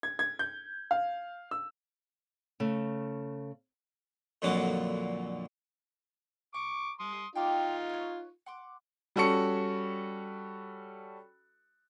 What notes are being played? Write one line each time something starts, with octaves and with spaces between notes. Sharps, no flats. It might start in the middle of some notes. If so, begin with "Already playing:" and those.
G#6
G#6
G6
F5
E6
C#3 A3
F2 A#2 D3 F#3 F#5 D6
A#5 C#6 D6
C6 D#6
D#4 F4 G5 C6 D6
B4 C#5
F#5 C6 D6
G3 C#4 F#4 A4 C#6 C#7